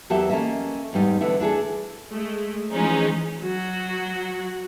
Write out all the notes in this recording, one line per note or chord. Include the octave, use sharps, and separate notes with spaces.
E2 F#3 G4 A4 A#4 E5
A#3 C#4 A4 D#5 E5
E2 G#2 G3 D#4
D3 E3 A3 B3 E4
D4 E4 G#4 A4
G#3 A3
E3 F3 G#3 C#4 D#4
F#3 F#4